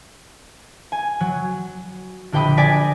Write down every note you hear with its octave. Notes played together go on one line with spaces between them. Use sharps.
G#5
F#3
A#1 D3 G4 G5 B5 D#6
D5 G#5 A#6 B6